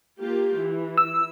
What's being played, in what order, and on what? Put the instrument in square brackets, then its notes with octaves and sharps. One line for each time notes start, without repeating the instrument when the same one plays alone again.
[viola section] A#3 F4 G4
E3
[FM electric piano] E6